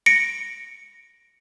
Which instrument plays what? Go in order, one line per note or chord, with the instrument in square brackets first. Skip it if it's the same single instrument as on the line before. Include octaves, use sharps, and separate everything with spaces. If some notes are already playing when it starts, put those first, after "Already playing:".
[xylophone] A#6 C#7 D7